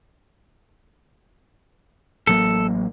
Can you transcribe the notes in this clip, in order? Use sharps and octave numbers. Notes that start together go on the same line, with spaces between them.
A1 F#3 A#3 A4